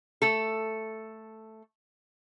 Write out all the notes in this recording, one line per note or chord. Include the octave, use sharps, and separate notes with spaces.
A3 A4